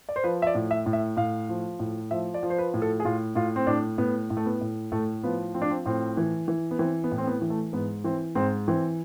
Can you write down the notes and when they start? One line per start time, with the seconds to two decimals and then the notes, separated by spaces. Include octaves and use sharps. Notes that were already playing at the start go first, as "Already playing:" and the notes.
0.09 D5
0.16 C5
0.24 F3 B4
0.42 E5
0.47 D5
0.55 A2
0.71 E5
0.86 A2
0.93 E5
1.17 A2 F5
1.49 F3
1.79 A2
2.11 F3 E5
2.34 D5
2.43 F3
2.50 C5
2.58 B4
2.74 A2
2.82 A4
3.00 G#4
3.05 A2 F4
3.35 A2 F4
3.56 C4
3.67 A2 D4
3.98 A2 B3
4.30 A2
4.37 A3
4.46 B3
4.61 A2
4.92 A2 A3
5.23 F3 B3
5.54 F3 C4
5.62 D4
5.70 C4
5.86 A2 C4
6.17 E3
6.48 E3
6.71 B3
6.79 E3 C4
7.04 B3
7.12 A2
7.18 C4
7.27 B3
7.42 E3
7.50 A3
7.73 G#2 B3
8.04 E3 C4
8.35 G#2 C4
8.68 E3 C4